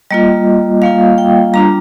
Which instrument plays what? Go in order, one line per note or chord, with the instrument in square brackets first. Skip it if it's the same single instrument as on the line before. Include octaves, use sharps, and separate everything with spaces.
[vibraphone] G3 A#3 F4 D#5
G3 A#3 F4 F5
G5
G3 D4 F4 A#5